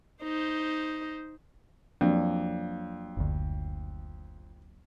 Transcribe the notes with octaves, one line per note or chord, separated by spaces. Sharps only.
D#4 C5
F2 F#3 A#3 D4
F#1 D2